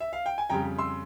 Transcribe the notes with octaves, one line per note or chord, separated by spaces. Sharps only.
E5
F5
G5
G#5
F2 C#3 G3 G5 A#5
C6 E6